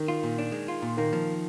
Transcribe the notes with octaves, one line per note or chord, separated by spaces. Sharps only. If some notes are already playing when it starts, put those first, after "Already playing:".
Already playing: D#3
F4
A#2
D4
G#3
F4
A#2
D#3 A#3
F3